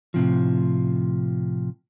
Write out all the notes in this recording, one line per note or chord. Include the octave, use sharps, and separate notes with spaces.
A2 C3 F3